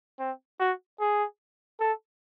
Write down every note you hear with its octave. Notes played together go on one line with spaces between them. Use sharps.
C4
F#4
G#4
A4